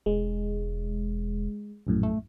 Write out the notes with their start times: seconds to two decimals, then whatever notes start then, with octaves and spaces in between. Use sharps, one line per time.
0.06 E1 G#3
1.87 A#1 F#2 A2
2.03 A3